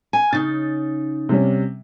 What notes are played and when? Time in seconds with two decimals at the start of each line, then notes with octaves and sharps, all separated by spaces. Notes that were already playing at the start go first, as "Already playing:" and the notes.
0.13 G#5
0.33 C#3 D#4 A6
1.29 C3 G3 C#4